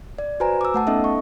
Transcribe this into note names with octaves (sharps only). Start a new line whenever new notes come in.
D5
F#4 B4 C5 G#5 A#5
D6 E6
A3 F#5 A5
B3 C#4 D#4 A4 D#5 E5
C#6